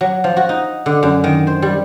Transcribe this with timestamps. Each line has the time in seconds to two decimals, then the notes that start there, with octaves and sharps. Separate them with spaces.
0.01 F#3
0.24 F3
0.36 F#4
0.49 D#4
0.86 D3
1.03 F#2
1.24 D#3
1.47 C5
1.62 G3